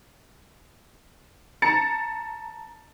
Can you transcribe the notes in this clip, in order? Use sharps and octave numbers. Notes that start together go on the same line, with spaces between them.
A5 A#5 A6 C#7